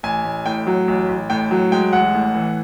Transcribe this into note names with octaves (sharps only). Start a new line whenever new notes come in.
A1 G#5
A1
A2 G5
F#3
A1
A1
A2 G5
F#3
G#3 G5
A1 F#5
A2
E3